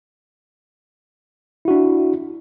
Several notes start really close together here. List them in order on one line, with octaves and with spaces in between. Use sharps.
E4 F#4 D4